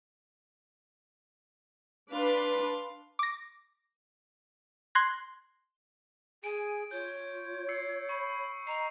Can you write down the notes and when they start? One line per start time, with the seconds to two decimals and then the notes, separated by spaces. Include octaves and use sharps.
2.12 D4 B4 F5 C6
3.19 D6 A#6
4.95 C6 F#6 G#6 A#6
6.44 G#4 G#5 D7
6.91 F4 C#5 G6
7.69 E6 C7 C#7
8.09 B5 C#6
8.67 D#5 A#5 C7